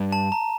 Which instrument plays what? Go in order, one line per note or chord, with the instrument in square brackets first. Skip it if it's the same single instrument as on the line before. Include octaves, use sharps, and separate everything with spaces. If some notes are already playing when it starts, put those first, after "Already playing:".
Already playing: [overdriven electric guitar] G2
[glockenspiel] A5
A#5